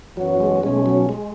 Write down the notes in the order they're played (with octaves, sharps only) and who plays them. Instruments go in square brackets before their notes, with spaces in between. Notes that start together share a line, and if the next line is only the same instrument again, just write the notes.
[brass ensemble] F#2 E3 B3 F#4 C#5 [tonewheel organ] F#3
[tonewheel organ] G#3
[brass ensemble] B1 B2 A3 C#4 [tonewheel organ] G#3
[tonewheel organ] F#3
G#3